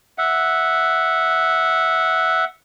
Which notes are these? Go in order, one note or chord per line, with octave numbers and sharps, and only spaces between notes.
E5 F#5